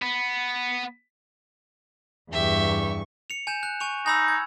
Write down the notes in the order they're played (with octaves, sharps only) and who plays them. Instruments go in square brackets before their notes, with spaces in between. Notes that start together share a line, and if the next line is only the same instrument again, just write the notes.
[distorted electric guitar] B3
[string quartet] E2 G2 C#6 [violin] G4 E5
[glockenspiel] C#7 F7
G#5 G6 E7
F#6
G#5 C#6 F7
[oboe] D#4 [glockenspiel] G#5 B5 E6
[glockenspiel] G#6